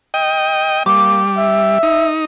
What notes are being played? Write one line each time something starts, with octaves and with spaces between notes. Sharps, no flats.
D#5 G5
G3 A#3 D6
E5
D#4